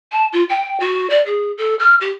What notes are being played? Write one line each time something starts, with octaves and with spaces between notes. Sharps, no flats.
A5
F4
G5
F#4
D5
G#4
A4
F6
G4